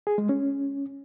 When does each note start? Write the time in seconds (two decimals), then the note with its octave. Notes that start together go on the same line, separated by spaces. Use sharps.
0.07 G#4
0.18 G#3
0.29 C#4